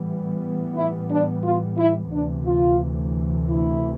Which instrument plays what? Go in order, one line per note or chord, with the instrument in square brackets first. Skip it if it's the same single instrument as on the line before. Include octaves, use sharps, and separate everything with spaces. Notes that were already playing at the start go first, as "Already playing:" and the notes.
Already playing: [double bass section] A2 E3 G3 B3
[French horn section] E4
D4
F4
E4
[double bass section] D2 C3 E3 [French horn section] D4
[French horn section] F4
E4